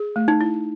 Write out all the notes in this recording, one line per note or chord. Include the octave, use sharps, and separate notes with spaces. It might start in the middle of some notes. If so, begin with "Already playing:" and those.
Already playing: G#4
A3
D#4
E4